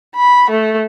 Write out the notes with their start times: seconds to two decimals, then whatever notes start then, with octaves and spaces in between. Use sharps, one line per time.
0.15 B5
0.50 A3